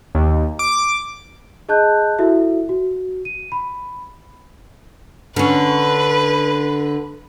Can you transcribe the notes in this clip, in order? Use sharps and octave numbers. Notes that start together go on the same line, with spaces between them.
D#2
D6
G#4 D#5 A5 F#6 G6
E4 F#4 A4 E5
F#4
D#7
B5
D3 C#4 B4